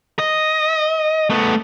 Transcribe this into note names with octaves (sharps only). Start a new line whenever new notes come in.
D#5
A3 B3